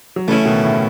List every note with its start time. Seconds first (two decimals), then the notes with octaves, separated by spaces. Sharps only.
0.16 F#3
0.28 C#3 E3 A3
0.31 C#4 E4
0.45 B2 D#3
0.63 A2 C#3